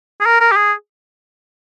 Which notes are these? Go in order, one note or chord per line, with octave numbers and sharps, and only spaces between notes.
G#4
A#4
A#4
G4
G#4